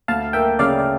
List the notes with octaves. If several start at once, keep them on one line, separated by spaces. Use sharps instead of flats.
D2 F5 A5
A#3 E5 G5
C#3 D5 F5
D5